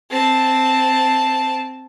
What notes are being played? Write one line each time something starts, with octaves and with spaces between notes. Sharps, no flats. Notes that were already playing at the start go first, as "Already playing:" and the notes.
C4 A5